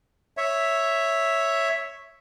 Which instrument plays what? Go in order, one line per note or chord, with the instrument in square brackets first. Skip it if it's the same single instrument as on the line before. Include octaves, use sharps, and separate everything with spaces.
[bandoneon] C#5 E5